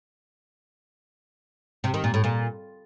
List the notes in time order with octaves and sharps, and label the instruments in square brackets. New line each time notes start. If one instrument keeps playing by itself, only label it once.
[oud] C3
D#3
A#2
A2
A#2